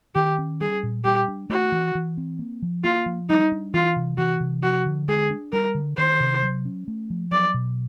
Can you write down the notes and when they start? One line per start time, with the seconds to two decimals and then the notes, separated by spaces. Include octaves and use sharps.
0.15 D#3 G4
0.39 C#4
0.61 G3 G#4
0.83 A#2
1.05 G3 G4
1.28 D4
1.50 A3 F#4
1.72 E3
1.95 E3
2.18 C4
2.39 A#3
2.62 F3
2.84 A#3 F4
3.06 F3
3.30 G3 D#4
3.52 D4
3.74 E3 F4
3.96 C3
4.18 E3 F#4
4.40 C3
4.63 F3 F#4
4.86 D3
5.08 G#3 G#4
5.30 D4
5.53 G3 A#4
5.75 D3
5.97 D#3 C5
6.20 C3
6.43 F#3
6.65 C#4
6.88 A3
7.10 F3
7.32 F#3 D5
7.54 B2